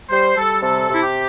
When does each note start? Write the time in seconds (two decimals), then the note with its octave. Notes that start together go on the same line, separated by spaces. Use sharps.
0.10 G3 C5
0.36 G3 A4
0.62 C3 A4
0.89 C3 E4
1.01 G4